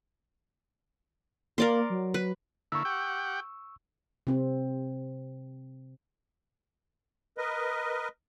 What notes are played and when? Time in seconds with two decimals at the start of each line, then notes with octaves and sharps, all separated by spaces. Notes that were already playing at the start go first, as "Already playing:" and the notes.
1.58 A#3 A#4 D5 C6
1.90 F#3
2.14 B4
2.72 D3 A#3 E4 C#6 E6
2.85 G4 F#5 G5
4.27 C3 C4
7.38 A#4 B4 D#5